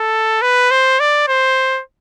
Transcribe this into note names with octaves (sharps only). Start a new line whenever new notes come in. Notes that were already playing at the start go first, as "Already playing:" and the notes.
Already playing: A4
B4
C5
D5
C5